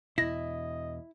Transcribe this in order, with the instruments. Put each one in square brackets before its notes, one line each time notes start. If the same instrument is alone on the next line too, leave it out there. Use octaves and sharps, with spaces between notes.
[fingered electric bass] E2 B2 [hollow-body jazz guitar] E4 [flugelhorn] D#5 [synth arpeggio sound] A#6